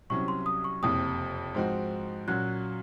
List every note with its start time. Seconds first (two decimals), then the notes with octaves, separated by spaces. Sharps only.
0.10 C2 C3 F#3 C#4 C#6
0.28 C6
0.46 D#6
0.64 C#6
0.82 F#1 F2 C3 D#6
1.55 G#2 F3 C4 D#4 F#4
2.28 A#2 F#3 C#4 F#4 F#6